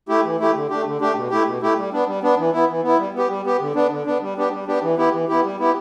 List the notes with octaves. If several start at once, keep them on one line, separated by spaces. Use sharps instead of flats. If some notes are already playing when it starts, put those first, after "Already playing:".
A3 E4 G4
E3
A3 E4 G4
D3
A3 D4 G4
D3
A3 D4 G4
B2
A3 E4 G4
B2
A3 E4 G4
G3
B3 D4
G3
B3 D4
E3
B3 E4
E3
B3 E4
G3
B3 G4
G3
B3 G4
D3
B3 D4
D3
B3 D4
G3
B3 D4 G4
G3
B3 D4 G4
E3
B3 E4 G4
E3
B3 E4 G4
G3
B3 E4 G4